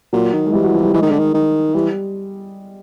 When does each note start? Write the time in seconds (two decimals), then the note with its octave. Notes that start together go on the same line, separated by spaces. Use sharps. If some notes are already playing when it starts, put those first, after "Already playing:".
0.13 A#2 F#3
0.33 D#3
0.46 G#3
0.53 E3 G3
0.63 F#3
0.74 F3
0.83 G3
0.94 E3 G#3
1.02 D#3
1.11 D3
1.19 D#3
1.34 D#3
1.74 E3 G3